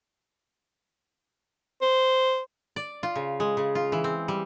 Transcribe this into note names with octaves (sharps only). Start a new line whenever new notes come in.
C5
D5
F4
C#3
G#3
C#3
F4
E3
C4
G3